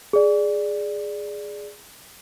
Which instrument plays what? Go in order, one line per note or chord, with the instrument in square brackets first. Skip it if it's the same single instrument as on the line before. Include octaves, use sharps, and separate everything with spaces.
[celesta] G#4 D5